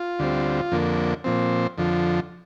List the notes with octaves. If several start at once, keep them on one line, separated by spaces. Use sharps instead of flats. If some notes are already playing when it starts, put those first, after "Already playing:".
Already playing: F4
D2 D3 G3 C4
F2 D3 A#3
A#2 F3 C4
F2 D3 F3